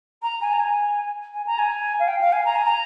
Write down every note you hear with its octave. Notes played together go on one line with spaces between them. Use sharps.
A#5
G#5
A#5
G#5
G#5
A#5
G#5
F5
G5
F5
G#5
A#5
G#5
A#5